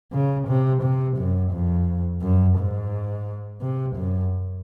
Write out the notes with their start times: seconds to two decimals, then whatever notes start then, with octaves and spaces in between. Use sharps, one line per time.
0.12 C#3
0.48 C3
0.82 C3
1.18 F#2
1.52 F2
2.21 F#2
2.57 G#2
3.61 C3
3.96 F#2